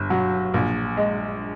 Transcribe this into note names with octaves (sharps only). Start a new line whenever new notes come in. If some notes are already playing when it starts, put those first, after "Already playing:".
Already playing: G1
F#3
A#1
G#3